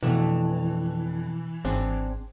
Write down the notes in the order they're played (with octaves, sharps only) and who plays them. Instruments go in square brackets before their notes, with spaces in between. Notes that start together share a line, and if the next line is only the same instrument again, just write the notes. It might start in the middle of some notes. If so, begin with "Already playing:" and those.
[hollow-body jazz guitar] F2 A3 D4 [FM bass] B2 [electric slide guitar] E3
[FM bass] G#1 [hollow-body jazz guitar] C4 D4 G#4